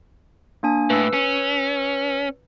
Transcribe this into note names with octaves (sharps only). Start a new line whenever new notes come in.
A#3 D4 G#5
A2 B4 E6
C#4